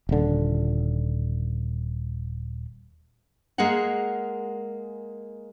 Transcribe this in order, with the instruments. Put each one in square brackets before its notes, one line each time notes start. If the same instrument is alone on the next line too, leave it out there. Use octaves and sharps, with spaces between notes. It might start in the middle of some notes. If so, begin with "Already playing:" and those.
[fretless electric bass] D#1 D3
[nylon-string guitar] G#3 A#3 G#4 A#4 F#5